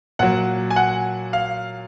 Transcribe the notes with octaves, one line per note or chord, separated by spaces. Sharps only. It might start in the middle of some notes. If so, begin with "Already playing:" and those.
A#2 F#3 F#5
G#5
F#5
F5